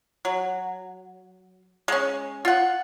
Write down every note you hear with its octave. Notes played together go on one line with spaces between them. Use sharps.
F#3
G#3 C#4
F4 F#5